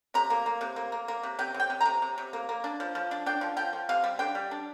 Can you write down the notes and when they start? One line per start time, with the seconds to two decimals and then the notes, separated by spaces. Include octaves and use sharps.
0.14 C3 A#5
0.30 A#3
0.46 A#3
0.61 C3
0.76 A#3
0.92 A#3
1.08 A#3
1.23 C3
1.39 C3 G5
1.54 C3
1.60 G5
1.70 C3
1.81 C3 A#5
2.02 C3
2.18 C3
2.33 A#3
2.49 A#3
2.64 D4
2.80 F3
2.95 F3
3.11 D4
3.26 D4 G5
3.41 F3
3.57 F3 G5
3.73 F3
3.89 C3 F5
4.04 G3
4.19 D4 G5
4.35 G3
4.51 D4